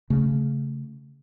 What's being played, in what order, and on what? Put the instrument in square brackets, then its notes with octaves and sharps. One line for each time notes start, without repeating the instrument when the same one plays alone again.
[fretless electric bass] C#3 A3